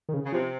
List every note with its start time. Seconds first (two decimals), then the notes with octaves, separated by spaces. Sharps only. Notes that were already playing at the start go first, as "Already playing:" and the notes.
0.09 D#3
0.14 C#3
0.24 C#3
0.32 C3 F3